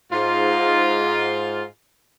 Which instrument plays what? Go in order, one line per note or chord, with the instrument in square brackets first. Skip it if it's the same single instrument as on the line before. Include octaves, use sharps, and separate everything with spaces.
[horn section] G#2 F4